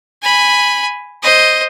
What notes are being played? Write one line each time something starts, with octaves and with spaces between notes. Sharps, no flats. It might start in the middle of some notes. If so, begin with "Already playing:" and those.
G#5 B5
C5 D#5